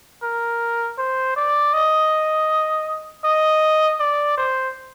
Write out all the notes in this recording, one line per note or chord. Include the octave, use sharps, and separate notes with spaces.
A#4
C5
D5
D#5
D#5
D5
C5